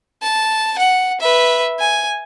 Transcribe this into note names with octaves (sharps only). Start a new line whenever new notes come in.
A5
F#5
B4 E5
G#5